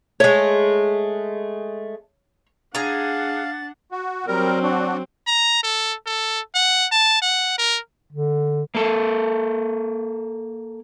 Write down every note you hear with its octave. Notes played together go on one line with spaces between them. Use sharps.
G#3 A3 C#5
D4 G#4 F5 F#5 A#5 A6
F#4
F#3 G3 C4 A#4
D4 F#4
A#5
A4
A4
F#5
A5
F#5
A#4
D3
A#3 A4